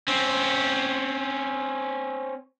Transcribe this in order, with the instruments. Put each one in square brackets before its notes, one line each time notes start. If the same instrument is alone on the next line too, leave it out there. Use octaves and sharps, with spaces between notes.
[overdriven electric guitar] C4 C#4